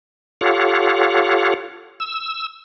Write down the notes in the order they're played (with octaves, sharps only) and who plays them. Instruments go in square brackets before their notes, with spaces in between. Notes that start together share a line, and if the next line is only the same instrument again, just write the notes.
[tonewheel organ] F4 G4 A4 C#5 F5 F#5
E6